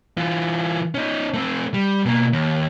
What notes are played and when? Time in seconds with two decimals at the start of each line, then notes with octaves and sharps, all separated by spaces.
0.17 E3 F4
0.95 C#4 D#4
1.34 A3 C4
1.74 G3
2.05 B2 A#3
2.33 D#2